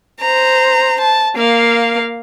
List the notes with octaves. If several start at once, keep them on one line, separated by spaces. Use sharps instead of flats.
C5 A#5
A5
A#3 F5